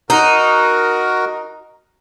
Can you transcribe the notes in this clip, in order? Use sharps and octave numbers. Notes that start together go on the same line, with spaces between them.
D#4 F#4 A#4